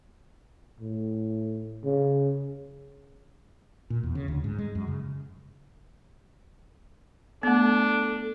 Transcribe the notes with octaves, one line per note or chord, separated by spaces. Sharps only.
A2
C#3
A#2
E2
C#3
D2
G#2
G#3
F#2
C#3
A3 B3 D4 A4